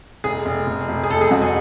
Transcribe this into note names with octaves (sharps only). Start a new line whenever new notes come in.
F1 G#4
F1
F1
F1
G#4
F1 A4
G#4
F2 F#4
G#4